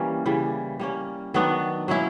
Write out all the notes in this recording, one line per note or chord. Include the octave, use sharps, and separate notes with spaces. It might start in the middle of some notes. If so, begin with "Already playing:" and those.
Already playing: E3 G3 A#3 C#4
C#3 E3 G3
G3 A#3 C#4
D#3 F#3 B3 D4
F#3 A#3 C#4 E4